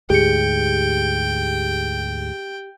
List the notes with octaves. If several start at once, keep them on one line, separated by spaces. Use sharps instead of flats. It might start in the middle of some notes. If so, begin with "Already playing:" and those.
D2 G#2 G4 G#4 G5 C#7